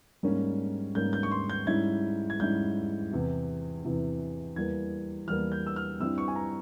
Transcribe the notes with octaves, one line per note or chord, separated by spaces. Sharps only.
G#2 G3 A#3 C#4
G#2 G3 A#3 C#4 G6
G6
C#6
C6
G6
G#2 G3 C#4 E4 G#6
G#6
G#2 G3 C#4 E4 G6
E2 C3 E3
E2 C3 E3
E2 E3 G3 A#3 G#6
E2 E3 G3 A#3 F6
G6
E6
F6
G2 G3 C4 E4 E6
C#6
G#5
A#5